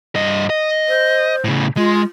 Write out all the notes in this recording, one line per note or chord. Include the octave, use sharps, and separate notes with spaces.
G2 D#5
D#5
C5
A2 C#3
G#3 F4